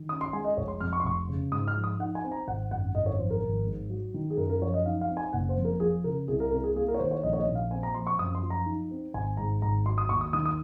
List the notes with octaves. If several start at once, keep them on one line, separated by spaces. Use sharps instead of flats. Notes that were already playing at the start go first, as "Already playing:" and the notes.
Already playing: D#3
C#4 D#6
C6
G#3 G#5
D#5
F1 C#5
C6
F2 F6
C#6
C6
F1 C#6
C#3
G#2 D#6
F6
F3
D#6
D#4 F#5
G#5
C4
A#5
G#1 F#5
F#2 F#5
G#1 D#5
C#5
F3 C5
A#4
G#1
G#2
F#3
D#3
G#4
F#2 A#4
A#4
F3 C#5
D#5
D#4 F5
F5
C4
G#5
F#1 F#5
C5
F2
A#4
F3 G#4
C#3 A#4
C2 G#4
A#4
C3 A#4
G#4
A#3 G#4
A#4
C#5
D#3 C5
C#5
A#1 D#5
C#5
D#5
A#2
F5
C4 G#5
A#5
F3 C6
C#6
F#2 D#6
C6
F3
A#5
D#4
C4
G#1 G#5
G#2 A#5
G#1 A#5
F#3 C6
D#6
D#2 C#6
D#6
D#3 D#6
D#6